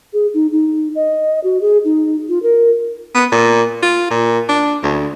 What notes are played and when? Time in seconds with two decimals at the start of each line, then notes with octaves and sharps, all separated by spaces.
0.13 G#4
0.34 D#4
0.52 D#4
0.95 D#5
1.44 F#4
1.61 G#4
1.85 D#4
2.29 F4
2.43 A#4
3.15 B3
3.32 A#2
3.83 F4
4.10 A#2
4.49 D4
4.83 D2